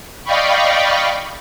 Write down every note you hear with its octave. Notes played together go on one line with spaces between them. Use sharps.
D5 D#5 F5 G5 B5 C#6